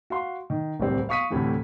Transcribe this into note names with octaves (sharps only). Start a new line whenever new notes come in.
F#4 F5 C6
D#3
D1 C2 G3 C4
F5 C#6 D#6 B6 C#7 D#7
D2 A2 C3 E3